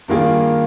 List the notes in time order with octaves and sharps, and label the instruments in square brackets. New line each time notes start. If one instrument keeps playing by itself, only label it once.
[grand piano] G2 D#3 A#3 F4 G#4